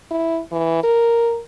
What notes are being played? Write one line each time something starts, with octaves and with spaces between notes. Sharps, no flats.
E4
E3
A#4